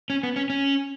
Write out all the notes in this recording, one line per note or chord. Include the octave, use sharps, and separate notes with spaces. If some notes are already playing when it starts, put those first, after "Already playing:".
C#4
B3
C#4
C#4